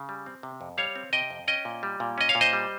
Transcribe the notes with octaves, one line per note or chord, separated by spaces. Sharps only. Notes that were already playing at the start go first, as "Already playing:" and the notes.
Already playing: C#3
G3
C4
C3
F2
G3 C#5 F5
C4
C3 D#5 G5
F2
C#4 D#5 G5
A#2
G3
A#2
C#4 D#5
C#5 F5
A#2
C5 D#5
G3